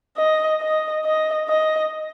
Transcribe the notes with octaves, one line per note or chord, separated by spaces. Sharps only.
D#5
D#5
D#5
D#5